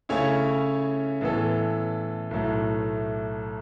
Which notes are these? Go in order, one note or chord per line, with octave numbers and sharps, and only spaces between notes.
C#3 A3 C#4 E4 C#5
A2 E3 B3 A4
B1 A2 A3